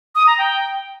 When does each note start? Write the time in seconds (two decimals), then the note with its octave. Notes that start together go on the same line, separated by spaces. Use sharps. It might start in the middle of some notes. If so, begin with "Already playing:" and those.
0.15 D#6
0.27 A#5
0.38 G5